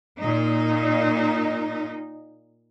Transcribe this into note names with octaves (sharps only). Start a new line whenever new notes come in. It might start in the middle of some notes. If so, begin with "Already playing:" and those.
A#2 D#4